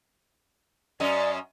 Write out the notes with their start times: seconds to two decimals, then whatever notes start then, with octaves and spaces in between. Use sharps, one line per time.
1.00 F#2 C#4 D5 D#5